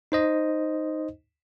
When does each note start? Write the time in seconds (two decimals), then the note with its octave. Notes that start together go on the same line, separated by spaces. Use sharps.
0.12 D#4 C5 D#5